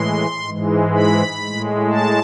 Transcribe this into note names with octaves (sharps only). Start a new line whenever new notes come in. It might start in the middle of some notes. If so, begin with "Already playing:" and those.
Already playing: A2 E3 G#3 C6
G#2 E3 G#3
B5
A2 G#3
A5